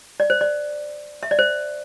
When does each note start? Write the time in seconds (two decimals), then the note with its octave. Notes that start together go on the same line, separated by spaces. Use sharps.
0.20 D5
0.30 C5
0.41 D5
1.23 E5
1.31 D5
1.39 C5